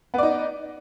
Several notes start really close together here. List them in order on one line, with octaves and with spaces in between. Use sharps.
B3 D5 D#4